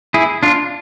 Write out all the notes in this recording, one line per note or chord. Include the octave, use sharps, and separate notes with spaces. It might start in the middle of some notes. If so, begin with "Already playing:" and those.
E4 G#4
D4 F4